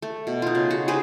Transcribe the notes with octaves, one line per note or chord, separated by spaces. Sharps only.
A3
B2
D#4 F4
C#3
F#4
G4 G#4 B4 C5